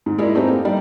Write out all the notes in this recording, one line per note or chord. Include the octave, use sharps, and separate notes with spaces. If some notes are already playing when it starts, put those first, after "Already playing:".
G#2
G#3 E4 A#4 D5
A3 B3 C4 D#4 G4
A#3
G3 D#4 D5